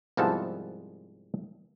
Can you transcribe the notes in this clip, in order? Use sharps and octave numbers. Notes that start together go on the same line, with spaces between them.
C2 G#2 F3 B3 A4 A5